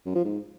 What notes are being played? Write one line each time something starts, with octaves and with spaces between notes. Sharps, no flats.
F#2
F3
G#2